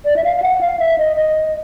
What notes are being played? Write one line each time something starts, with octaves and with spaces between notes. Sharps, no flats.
D5
E5
F5
F5
F#5
F5
E5
D#5
D#5